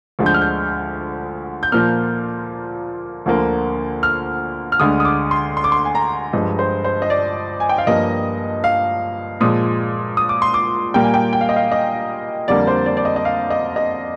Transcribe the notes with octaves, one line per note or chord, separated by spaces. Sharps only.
D2 D3 F3 G#3
G6
F6
G6
G6
A#2 F3 A#3 F6
D2 D3 F3 A#3
F6
F6
D2 D3 G#3 D#6
D#6
D6
C6
C6
D6
C6
G#5
A#5
G2 F3 G#3 D#5
C5
C5
D#5
D5
G#5
G5
F5
G2 F3 A#3 D#5
F5
A#2 F3 G#3 D#6
D#6
D6
C6
D6
A#2 G3 A#3 G5
G#5
G5
G5
F5
D#5
F5
D#5
F2 D3 G3 A#3 D5
C5
D5
D5
D#5
D#5
F5
D#5
D#5